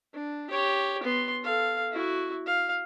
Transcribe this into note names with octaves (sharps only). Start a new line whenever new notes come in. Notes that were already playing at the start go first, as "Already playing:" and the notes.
D4
G4 C#5
B3 C6
A4 F5
E4 F#4
F5